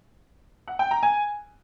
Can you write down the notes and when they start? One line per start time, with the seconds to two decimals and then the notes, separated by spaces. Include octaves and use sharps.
0.68 F#5
0.79 G5
0.91 A#5
1.03 G#5